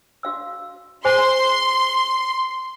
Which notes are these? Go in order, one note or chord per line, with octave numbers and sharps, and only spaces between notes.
F#4 F5 E6
G#4 C5 G#5 C6